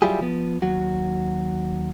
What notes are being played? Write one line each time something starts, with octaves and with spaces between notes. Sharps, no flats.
F#3 G3 E4 F4 G4 G#4
F3 B3
D#2 F#3 F#4